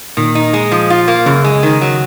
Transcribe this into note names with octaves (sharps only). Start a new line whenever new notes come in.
A#2 D#3
D#4
G#3
F3
F4
A#3
F#2 C#3
G#3
D#3
F#3